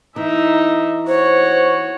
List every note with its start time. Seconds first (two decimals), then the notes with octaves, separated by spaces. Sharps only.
0.16 E3 D#4 E5
1.07 F#4 C5 C#5